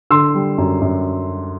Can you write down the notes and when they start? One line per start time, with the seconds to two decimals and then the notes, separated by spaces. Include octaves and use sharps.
0.10 D3 C6 E6
0.35 G3
0.58 F#2
0.81 F#2